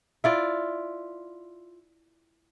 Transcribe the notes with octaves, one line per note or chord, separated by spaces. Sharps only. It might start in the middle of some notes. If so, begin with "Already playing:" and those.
E4 F4 D5